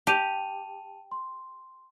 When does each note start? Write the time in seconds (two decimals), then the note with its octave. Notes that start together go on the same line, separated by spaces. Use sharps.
0.07 G4 A5 D#7 F7
1.11 C6